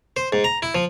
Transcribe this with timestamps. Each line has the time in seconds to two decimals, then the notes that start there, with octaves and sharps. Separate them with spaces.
0.17 C5
0.33 G#2
0.44 A#5
0.62 E4
0.75 F3